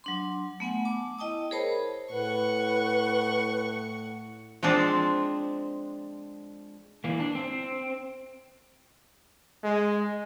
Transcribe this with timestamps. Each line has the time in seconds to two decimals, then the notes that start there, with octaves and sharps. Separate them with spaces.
0.04 F#3 D4 C6
0.60 A3 B3 F#5 G#5
0.85 A5 D6
1.19 E4 D#5 G5 A5 D#6
1.51 G#4 A#4 C5 C#5 A5 B5
2.12 A2 B4 F#5 C#6
4.63 F3 G#3 C4 D4
7.04 E3 A#3
7.20 D4
7.35 C4
9.64 G#3